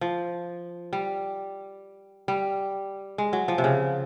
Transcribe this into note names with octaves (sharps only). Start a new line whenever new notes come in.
F3
G3
G3
G#3
F#3
F3
C3
C#3